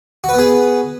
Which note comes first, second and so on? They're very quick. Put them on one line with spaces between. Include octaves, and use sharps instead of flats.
F#4 B4 B3 G#4